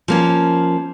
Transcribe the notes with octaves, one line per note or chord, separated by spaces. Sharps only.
F3 A#3 C#4